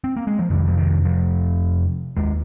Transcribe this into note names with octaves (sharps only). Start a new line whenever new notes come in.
C4
A#3
G#3
F3
F2 C3 D#3
F3
D#3
F3
D#2 G#3